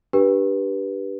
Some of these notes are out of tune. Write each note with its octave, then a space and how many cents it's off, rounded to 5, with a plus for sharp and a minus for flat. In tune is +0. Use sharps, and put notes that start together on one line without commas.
D4 +0 G4 +0 B4 -20